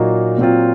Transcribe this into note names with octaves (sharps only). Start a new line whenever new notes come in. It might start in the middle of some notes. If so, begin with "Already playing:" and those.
Already playing: A#2 F#3 A#3 D#4 F#4
A#2 F#3 C4 F4